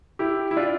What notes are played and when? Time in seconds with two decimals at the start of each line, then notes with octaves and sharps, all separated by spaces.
0.19 E4 G4
0.51 E4
0.56 D4 F4